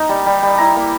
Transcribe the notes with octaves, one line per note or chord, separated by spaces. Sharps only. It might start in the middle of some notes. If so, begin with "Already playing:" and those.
Already playing: A#3 D#4
G3
G3
G3
E4 A#5
A#3